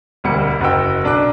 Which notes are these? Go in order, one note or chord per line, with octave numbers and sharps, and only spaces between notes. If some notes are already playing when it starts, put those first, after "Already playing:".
E1 D2 G3 A#3 C#7
F#1 F#4 A#4 D#5 G5 E6
B1 D4 D6 F#6